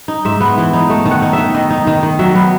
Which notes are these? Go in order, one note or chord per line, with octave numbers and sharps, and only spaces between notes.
D#4
G#2 E5
B3
E3
D#4
A3
D#3
F#5
D#4
E5
D#3
D#3 D#5
D#4
D#3
D#3
F#3 E5
B3